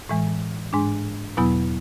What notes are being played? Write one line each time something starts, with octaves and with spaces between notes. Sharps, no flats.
A2 E3 G#3
G#2 G#3 D4
E2 B2 F#3 B3 E4